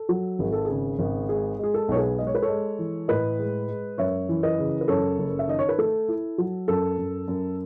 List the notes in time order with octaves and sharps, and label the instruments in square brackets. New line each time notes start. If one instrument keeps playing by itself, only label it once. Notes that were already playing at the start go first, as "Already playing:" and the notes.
Already playing: [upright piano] A4
F#3
G#1 G#4
A4
C#3 G#4
G#1
G#3 G#4
G#3 G#4
A4
B1 C#5
G#4 B4
G#3 D#5
C#5
B4
A4 C#5
G#3
E3
A2 B4 D#5
G#3
G#3
F#2 C#5 E5
E3
B4 D#5
C#3
B4
F#2 A4 C#5
F#1
E5
D#3 D#5
C#5
B4
A3 A4
E4
F#3
F#2 A4
F#2
F#2